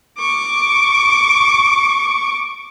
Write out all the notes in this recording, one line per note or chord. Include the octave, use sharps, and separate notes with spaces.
C#6 D6